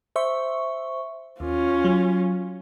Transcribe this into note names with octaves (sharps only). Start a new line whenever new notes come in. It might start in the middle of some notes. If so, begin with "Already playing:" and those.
C5 E5 C#6
D#2 C#4 F4
F#3